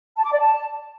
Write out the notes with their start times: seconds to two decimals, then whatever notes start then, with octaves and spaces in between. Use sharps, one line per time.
0.17 A5
0.25 D6
0.32 D5
0.40 A5